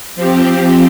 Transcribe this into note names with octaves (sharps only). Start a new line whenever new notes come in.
F3 C4 G4